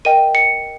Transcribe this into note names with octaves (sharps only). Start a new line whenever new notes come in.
A#4 D#5 G5 D#7
C#7